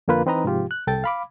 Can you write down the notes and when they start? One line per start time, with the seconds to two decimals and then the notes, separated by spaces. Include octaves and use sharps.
0.08 F2 D3 A#3 F4 B4
0.26 E3 C4 D#4 B4 D#5 A#5
0.45 G#2 C3 F3 F4 G4
0.71 F#6
0.87 C2 A4 G5 A6
1.04 F5 B5 D6